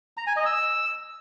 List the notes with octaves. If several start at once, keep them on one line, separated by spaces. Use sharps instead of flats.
A#5
G#5
D#5
E6